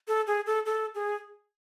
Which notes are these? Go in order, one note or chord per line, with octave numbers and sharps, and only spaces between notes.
A4
G#4
A4
A4
G#4